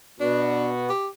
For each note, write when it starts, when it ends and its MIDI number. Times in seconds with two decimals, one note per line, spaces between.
0.20 0.90 47
0.20 0.90 59
0.20 0.69 62
0.20 0.90 66
0.90 1.08 67